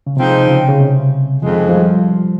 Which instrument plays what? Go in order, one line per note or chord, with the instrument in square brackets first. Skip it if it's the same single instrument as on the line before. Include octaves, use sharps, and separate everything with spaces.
[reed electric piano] C#3
[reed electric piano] C3 [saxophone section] F3 G#3 C4 D#4
[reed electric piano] C#3
C#3
C3
[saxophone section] F2 D#3 G#3 [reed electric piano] F3
[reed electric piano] F3
G3